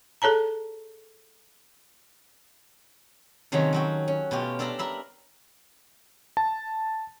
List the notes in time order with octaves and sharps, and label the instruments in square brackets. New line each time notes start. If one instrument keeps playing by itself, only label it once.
[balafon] G#4 A4 C#5 A5 A#5
[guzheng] C3 D#3 F#3 A3 C#4
F#3 F#4 G5
C#4
B2 A3 F4 G4
D4 A4 E5 A5 A#5
A#4 E5 B5
[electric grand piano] A5